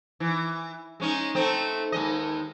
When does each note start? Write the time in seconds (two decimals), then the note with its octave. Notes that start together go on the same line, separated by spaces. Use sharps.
0.20 E3
1.00 G#3 C#4 D#4
1.35 A3 C4 D#4
1.92 D#2 G#3 D#5